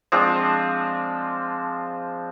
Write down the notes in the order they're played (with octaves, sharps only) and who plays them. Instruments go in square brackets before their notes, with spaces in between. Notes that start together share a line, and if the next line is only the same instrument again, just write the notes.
[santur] F3 G#3 C4 D4